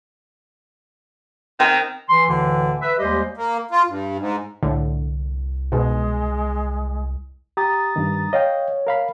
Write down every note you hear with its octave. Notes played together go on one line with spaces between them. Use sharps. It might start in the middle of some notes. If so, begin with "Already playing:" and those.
D#3 C4 G5
E3 C6
D2 A2 D3 E3
B4 E5
D#2 G3 G#3 G4 C5 D#5
A#3
F4
G2
G#2
C2 A2 D3
G#2 B2 G#3
G4 A#5 D#6 A6
G2 D#3
C#5 D#5 F5 G5
A#4 F5 B5